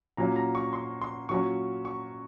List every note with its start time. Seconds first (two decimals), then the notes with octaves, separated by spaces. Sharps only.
0.17 A#2 F#3 C#4 A#5
0.36 A#5
0.55 C#6
0.73 C6
1.02 C6
1.29 A#2 F#3 C#4 C#6
1.85 C#6